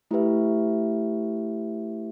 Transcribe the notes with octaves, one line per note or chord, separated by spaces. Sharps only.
A3 E4 G4 B4 E5